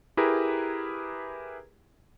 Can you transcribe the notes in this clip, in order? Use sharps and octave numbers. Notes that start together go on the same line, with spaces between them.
E4 G4 G#4 A#4 B4 A#5